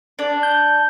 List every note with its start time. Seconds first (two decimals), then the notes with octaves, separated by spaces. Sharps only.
0.19 D4
0.43 G6